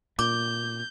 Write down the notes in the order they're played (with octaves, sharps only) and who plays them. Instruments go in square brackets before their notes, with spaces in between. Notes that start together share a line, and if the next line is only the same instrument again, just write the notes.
[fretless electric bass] A#2 [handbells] D6 [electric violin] G6